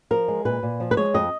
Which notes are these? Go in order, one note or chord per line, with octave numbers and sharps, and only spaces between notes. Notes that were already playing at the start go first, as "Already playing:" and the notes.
F3 A#4
G#3
A#2 B4
A#2
F3
B4
G#3 C#5
F2 D#5